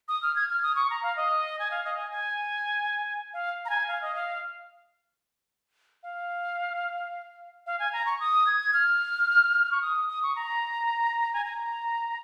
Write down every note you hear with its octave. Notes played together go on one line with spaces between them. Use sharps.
D#6
F6
G#6
F6
D#6
C#6
A#5
F5
D#5
G#5
F5
D#5
G#5
G#5
F5
A#5
G#5
F5
D#5
F5
F5
F5
G#5
A#5
C#6
D#6
G#6
F6
C#6
D#6
D#6
C#6
A#5
G#5
A#5